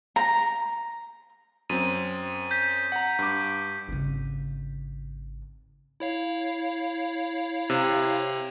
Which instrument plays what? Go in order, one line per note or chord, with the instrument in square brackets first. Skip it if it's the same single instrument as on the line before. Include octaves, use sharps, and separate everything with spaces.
[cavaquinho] A#5
[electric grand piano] F#2 C4 [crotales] D#7
[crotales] G6 B6
[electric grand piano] F#5 A#5
G2 D6
[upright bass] G#1 C#3
[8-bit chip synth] E4 C#5 F5
[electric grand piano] C3